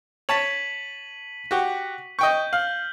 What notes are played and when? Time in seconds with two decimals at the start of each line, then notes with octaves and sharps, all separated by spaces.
0.29 C#5 A5 B6 D#7 F#7
1.51 F#4 G4
2.19 D#5 G5 C#6 G6
2.53 F5 F6 F#7